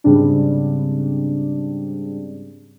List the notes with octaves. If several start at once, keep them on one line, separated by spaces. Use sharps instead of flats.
G#2 C#3 G3 C4 D4